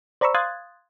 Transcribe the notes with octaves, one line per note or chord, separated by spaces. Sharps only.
C5 D5 A#5 B5 C#6 E6
F5 C6 D#6 F#6 G#6 A6